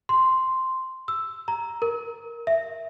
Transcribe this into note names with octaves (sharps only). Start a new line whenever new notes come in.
C6
E6
A#5
A#4
E5